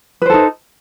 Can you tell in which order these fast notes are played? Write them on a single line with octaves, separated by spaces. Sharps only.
B4 C5 A4 D#4